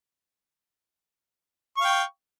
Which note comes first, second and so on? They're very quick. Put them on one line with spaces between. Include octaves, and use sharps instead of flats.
C#6 F5 G5